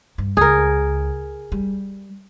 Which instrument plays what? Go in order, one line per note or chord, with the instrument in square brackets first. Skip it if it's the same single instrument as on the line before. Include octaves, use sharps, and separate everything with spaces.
[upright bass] G2
[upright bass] C#2 [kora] G#4 A#4
[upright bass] G3